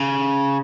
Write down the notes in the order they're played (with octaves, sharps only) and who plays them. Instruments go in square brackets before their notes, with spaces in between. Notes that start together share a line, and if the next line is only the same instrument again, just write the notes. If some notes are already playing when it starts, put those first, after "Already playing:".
Already playing: [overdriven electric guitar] C#3